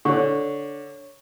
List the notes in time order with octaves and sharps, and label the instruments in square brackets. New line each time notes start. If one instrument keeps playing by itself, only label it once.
[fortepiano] D3 [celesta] C#5 C#6